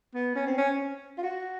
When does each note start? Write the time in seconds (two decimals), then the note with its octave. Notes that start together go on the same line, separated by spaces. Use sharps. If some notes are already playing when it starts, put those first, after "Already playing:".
0.14 B3
0.36 C#4
0.47 C4
0.58 C#4
1.18 F4
1.23 F#4